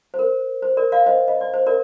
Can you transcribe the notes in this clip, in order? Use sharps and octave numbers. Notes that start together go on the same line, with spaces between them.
C5
A#4
C5
A#4 D5
D5 F5
C5 D#5
D#5
D5
C5
A#4 D5